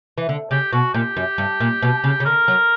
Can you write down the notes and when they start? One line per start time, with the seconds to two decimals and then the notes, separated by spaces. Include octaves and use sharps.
0.18 E3
0.29 D3
0.51 C#3 G4
0.72 B2 F#4
0.94 A#2 G4
1.17 F#2
1.38 G2
1.60 A#2
1.82 B2
2.04 C#3
2.20 C#3
2.25 D3 A#4
2.48 F#3